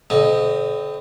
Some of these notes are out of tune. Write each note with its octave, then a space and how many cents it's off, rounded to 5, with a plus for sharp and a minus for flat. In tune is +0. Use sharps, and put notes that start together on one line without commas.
D3 -45 C4 -5 D#5 +0